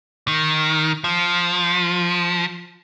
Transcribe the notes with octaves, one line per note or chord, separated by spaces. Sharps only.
D#3
F3